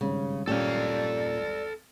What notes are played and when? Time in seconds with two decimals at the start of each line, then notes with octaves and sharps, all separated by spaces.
0.01 G#1 G2 C#3
0.47 A#2 C#4 G4 A4 D5 F5